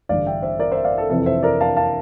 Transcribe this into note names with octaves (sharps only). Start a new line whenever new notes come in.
A1 G2 D3 D5 F5
E5 G5
C5 E5
A#4 D5
C5 E5
D5 F5
A4
F2 C3 E3 A4
C5 E5
A#4 D5
F5 A5
F5 A5